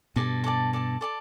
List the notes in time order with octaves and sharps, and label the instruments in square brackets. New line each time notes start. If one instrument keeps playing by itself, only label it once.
[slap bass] G2 B2 [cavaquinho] A4 D5 A5
[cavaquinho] A4 D5 A5
A4 D5 A5
A4 D5 A5